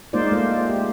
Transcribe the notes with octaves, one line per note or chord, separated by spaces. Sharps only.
G#3 A#3 D#4 F4 C5 D5
G#3 A3 C5
G4